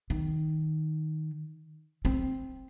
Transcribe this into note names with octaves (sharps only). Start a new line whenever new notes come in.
D#3
C4